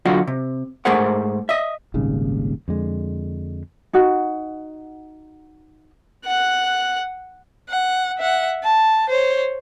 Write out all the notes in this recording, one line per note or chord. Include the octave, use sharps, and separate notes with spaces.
D3 F#3 F4 F#4 D#5 F#5
C3
G#2 A3 G#4 A#4 C5 F#5
D#5 E5
D#1 G#1 D#2 C#3
F2 D3 G#3
D#4 F#4 F#5
F#5 F#6
F#5
E5 F#5
A5
C5 C#5